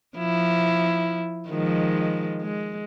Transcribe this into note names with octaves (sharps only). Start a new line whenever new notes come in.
F3 E4
D#3 F3 G#3
G#3